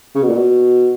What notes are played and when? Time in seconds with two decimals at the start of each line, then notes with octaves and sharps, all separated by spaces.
0.15 C#3
0.23 B2
0.29 A#2
0.37 B2